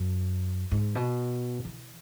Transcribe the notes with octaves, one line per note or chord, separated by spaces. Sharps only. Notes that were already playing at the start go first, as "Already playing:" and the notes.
Already playing: F#2
G#2
B2
E3